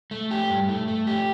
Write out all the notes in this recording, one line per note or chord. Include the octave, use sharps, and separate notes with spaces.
A3
G4
G2
A3
A3
G4